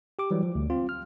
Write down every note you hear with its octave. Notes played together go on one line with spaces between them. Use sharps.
G4 D6
E3 F#3 G3
F3
D2
C4 F4
F6